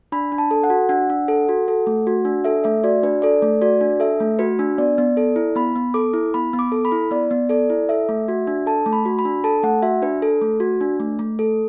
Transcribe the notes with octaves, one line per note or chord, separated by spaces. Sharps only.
D4 B5
D4
A5
A4
F#5
F#4
D4 F#5
D4
A4
F#4
A4
A3
F#4
D4
A4 E5
A3 E5
F#4 D5
D4 B4
A4 D5
A3
F#4 D5
D4
A4 E5
A3
F#4 B4
D4
B3 D5
B3
A4
E4
B3 B5
B3
A4 D6
E4
B3 B5
B3
D6
A4
B5
E4
B3 D5
B3
A4 D5
E4
A4 E5
A3
F#4
D4
A4 A5
A3
B5
F#4
B5
D4
A4 A5
A3 F#5
F#4 E5
D4 B4
A4
A3
F#4
D4
A3
A3
A4